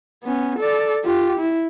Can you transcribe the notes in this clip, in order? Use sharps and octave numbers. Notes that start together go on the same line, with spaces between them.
B3 C#4
A4 D5
F4 G4
E4